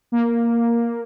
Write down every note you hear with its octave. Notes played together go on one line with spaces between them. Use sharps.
A#3